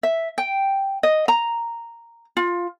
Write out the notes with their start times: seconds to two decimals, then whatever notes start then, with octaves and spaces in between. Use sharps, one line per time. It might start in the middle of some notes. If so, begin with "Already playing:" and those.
0.03 E5
0.38 G5
1.03 D#5
1.28 A#5
2.37 F4